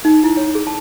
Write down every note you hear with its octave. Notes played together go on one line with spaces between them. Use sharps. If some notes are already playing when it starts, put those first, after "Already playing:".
D#4
E4
C#5
G#4
A5